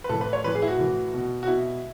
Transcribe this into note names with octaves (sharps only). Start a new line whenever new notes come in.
B4
A2 E3 A4
B4
C#5
A2 E3 B4
G#4
E4
F#4
A2 E3
B2
F#4
B2 E4